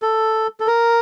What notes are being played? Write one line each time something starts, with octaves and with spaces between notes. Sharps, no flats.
A4
A4
A#4